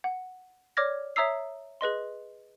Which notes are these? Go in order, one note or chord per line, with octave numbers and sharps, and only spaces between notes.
F#5
C#5 D5 D6 F6 G#6 A#6
C#5 E5 A#5 D#6 E6 C7
G#4 B4 D#5 C6